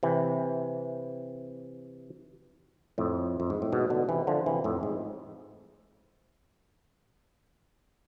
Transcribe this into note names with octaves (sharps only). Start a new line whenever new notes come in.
C3 E3
F2 A2
F2
G#2
A2
G#2 B2
B2 D3
C3 E3
D3 F3
C3 E3
F2 A2
G#2